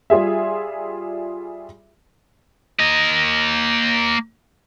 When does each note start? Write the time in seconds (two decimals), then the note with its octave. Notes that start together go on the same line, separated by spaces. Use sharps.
0.10 G3 F4 G#4 E5
2.80 A#3 D#5